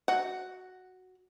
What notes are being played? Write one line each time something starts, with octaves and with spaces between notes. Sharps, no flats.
F#4 F#5